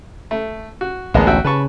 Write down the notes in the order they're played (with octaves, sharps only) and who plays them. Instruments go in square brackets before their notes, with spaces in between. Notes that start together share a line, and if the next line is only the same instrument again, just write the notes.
[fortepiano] A3
F#4
[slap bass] A1 D2 [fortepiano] G#3 A#3 B3
[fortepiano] F#4 E5 G5
[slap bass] C#3 [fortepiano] B4 A5 C#6